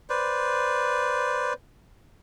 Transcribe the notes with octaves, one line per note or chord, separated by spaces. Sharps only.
B4 C5 D5